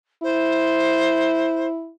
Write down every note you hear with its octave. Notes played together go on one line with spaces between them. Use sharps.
E4 C5